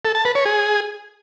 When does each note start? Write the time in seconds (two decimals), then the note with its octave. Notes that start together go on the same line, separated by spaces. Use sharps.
0.05 A4
0.15 A5
0.25 B4
0.35 C#5
0.45 G#4